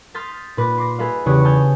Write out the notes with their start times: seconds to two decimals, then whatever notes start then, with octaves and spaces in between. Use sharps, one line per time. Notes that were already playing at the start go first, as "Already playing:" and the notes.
0.14 C6 D#6 F6 G6 A6 B6
0.57 A#2 B4 D6 A#6
0.78 C6 D6 A#6
0.98 G#4 A4 B4 D#5 F5
1.26 E2 C#3 G4 C#5 D#6 F#6
1.45 G#5 A5 D#6 F6 G6 G#6